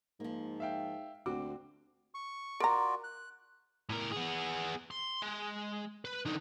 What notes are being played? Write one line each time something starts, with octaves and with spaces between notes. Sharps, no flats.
G#2 F3 A#3
E5 F5 G5
D2 C4 F#4 D6
C#6
F4 F#4 A#4 D5 A#5
F#6
A2 A#4
B3 G#4
C6
G#3
B4
D3 D#4